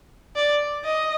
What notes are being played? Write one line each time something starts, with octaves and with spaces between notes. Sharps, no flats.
D5
D#5